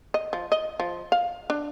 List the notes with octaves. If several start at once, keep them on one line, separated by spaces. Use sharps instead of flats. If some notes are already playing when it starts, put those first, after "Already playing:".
D#5
F3
D#5
F3
F5
D4